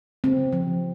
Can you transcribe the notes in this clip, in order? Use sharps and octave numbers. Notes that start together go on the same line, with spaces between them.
C#3 C4
F3